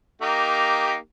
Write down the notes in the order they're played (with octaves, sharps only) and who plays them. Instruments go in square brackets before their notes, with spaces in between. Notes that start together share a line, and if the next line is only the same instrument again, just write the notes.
[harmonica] A#3 D#4 G4